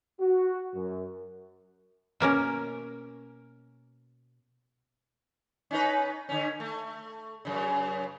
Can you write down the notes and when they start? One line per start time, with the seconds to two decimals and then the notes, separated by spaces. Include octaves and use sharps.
0.20 F#4
0.75 F#2
2.20 B2 A#3 C#4 A#4
5.71 C#4 D#4 B4
6.29 D3 C#4
6.60 A3
7.45 F#2 C#3